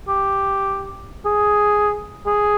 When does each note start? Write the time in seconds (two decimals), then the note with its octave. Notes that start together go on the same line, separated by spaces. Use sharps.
0.08 G4
1.25 G#4
2.26 G#4